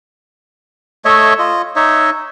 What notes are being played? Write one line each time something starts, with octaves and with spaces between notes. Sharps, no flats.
A3 C#5 D#5 E5
F4 D#5
D#4 C#5 D#5 E5